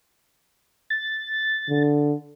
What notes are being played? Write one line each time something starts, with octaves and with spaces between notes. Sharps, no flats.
A6
D3